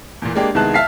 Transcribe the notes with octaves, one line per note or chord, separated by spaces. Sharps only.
E2 A#2
G#3 A#3 D4 G4
C2 D#3 G#3 B3 A5 F#6
E5 F5 A5 F6 B6 C7